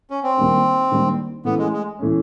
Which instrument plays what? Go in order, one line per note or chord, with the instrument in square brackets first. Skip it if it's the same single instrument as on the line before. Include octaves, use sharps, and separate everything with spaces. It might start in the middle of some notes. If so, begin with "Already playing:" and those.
[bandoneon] C#4
C4
[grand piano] D#3 G3 A#3 D4
D#3 G3 A#3 D4
[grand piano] E3 A3 C#4 [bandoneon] B3
[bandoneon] G#3
G#3
[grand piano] E3 A3 C#4